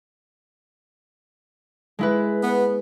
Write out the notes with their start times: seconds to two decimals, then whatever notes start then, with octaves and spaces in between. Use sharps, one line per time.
1.99 G#3 E4 B4
2.43 B3